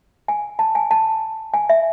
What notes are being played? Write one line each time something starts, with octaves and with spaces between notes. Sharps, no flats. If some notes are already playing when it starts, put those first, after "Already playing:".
G#5
A5
G#5
A5
G#5
E5